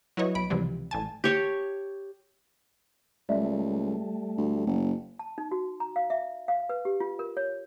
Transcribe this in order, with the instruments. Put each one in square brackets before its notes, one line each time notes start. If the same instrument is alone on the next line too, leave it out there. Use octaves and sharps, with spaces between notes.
[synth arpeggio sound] F#3 E4 B4 C#5 D#5
B1 B5 D7
C#2 C3 E3 F3 G3
A1 G#5 A5
[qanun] G4 C#5 A5
[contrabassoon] C#2 [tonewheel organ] G3 A3
[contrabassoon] D2
F#1
[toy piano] A5
D#4
F#4
A#5
F5
E5
F5
B4
G4
F4
A#4
C#5